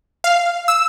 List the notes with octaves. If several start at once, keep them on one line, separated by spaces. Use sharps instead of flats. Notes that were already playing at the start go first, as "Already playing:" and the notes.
F5
E6